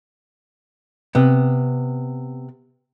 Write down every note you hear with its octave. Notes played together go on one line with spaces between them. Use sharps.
C3 B3